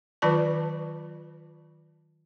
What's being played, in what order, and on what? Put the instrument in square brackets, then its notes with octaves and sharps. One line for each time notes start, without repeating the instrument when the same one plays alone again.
[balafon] D#3 F#3 F4 B4 D5 A5